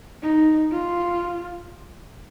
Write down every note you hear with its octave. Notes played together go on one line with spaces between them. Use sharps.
D#4
F4